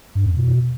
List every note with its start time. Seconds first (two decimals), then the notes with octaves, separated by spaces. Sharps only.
0.15 G2
0.26 F2
0.37 B2